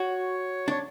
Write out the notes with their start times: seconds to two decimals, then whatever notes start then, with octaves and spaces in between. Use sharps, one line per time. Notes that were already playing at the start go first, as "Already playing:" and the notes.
Already playing: F#4 C#5
0.68 D4 C#5